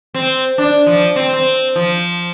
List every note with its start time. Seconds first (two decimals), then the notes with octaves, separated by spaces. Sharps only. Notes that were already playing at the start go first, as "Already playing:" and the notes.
0.14 C4
0.58 D4
0.86 F3
1.16 C4
1.33 C4
1.76 F3